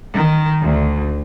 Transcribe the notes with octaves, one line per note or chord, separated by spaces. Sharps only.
D#3
D2